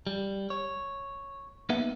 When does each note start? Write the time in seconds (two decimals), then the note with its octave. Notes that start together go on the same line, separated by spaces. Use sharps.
0.07 G3
0.50 C#5
1.69 A#3 B3 D#4 B4 E5 F#5